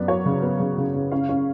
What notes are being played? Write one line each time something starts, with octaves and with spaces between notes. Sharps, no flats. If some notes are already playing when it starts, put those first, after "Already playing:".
Already playing: F#2 B3 D5
F#3 C#5
C#3
B3
C#3
C#3
C#3
C#4 F5
C#4